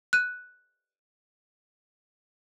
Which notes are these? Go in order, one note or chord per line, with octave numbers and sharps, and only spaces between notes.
F#6 D#7